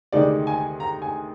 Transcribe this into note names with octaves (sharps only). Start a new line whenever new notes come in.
D2 C3 D#3 G#3 D#4 D5
G#5
A#5
G#5